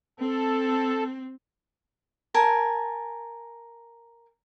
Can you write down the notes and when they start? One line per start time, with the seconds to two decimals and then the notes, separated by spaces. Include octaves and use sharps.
0.20 C4 A4
2.34 A#4 G#5 A5